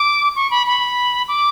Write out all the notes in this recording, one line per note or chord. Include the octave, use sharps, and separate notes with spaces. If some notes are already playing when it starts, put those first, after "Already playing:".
Already playing: D6
C#6
B5
B5
D6